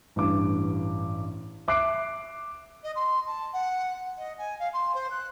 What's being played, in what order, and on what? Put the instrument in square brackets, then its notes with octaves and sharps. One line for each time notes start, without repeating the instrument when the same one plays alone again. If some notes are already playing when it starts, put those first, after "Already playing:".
[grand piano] A1 G2 D6
E5 D6 F#6 C7 D7
[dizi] D#5
C6
A5
F#5
D#5
G#5
F5
C6
C5
F#6